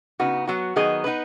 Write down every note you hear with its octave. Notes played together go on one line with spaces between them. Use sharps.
C#3 B3 D#4 F#4
F#3 B3 F#4
D#3 F#3 B3 G#4 D#5
B3 D#4 B4